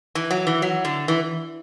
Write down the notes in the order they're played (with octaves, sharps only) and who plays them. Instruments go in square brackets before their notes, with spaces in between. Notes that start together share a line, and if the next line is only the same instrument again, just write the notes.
[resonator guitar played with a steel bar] E3
F#3
E3
F#3
D3
E3